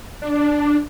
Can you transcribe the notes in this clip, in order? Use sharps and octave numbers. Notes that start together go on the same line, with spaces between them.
D4